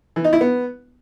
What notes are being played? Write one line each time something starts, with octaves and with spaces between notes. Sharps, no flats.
E3
D#4
E4
B3